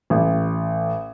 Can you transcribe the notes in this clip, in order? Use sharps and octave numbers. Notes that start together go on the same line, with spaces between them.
A1